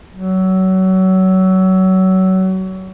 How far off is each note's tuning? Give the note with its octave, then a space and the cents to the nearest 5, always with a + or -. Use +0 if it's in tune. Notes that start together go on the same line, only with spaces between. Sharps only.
F#3 +25